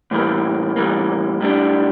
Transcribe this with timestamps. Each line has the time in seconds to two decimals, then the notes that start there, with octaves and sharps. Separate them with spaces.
0.11 A2 E3 G3 A#3
0.76 A2 E3 G3 A#3
1.41 A2 G3 D4